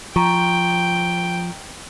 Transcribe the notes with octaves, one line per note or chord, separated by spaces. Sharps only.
F3 G5 A#5 C#6